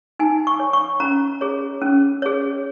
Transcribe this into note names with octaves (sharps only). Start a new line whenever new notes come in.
D#4 G#5
C#6
C#5
C#6
C#4 A#5
G#4 C#5
C#4
G#4 C#5